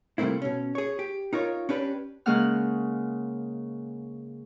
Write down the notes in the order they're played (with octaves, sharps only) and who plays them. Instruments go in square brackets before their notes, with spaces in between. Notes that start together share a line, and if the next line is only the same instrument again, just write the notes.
[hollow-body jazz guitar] C3 G3 A3 A#3 C4 E4
B2 C#4
G#4 C#5
G4
D#4 F4 A#4 C#5
C#4 D4 G4 B4
[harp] C#3 G#3 A#3 C#4 F#5 F6